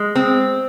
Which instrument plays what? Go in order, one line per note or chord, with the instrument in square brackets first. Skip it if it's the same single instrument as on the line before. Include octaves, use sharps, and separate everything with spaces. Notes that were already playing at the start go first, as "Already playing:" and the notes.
Already playing: [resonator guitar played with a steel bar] G#3
C4